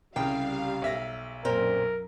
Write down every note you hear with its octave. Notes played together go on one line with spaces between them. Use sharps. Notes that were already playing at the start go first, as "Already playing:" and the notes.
C2 C#3 G3 F5 G5
B1 E5 A#6
F#2 A#2 C4 A#4